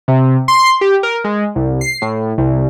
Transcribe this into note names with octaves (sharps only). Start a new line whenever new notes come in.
C3
C6
G4
A#4
G#3
C2
C7
A2
C2